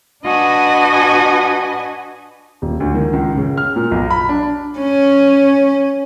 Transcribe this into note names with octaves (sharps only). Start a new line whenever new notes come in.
D4 F#4 B4 D#5 G#5 A5
D#1
D2
D#3
C#2
C#3
F6
A#2
B1
B5
D4
C#4